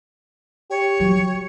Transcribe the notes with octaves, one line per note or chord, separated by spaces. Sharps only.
G4 C#5
F#3